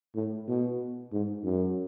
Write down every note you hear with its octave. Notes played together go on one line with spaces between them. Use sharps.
A2
B2
G#2
F#2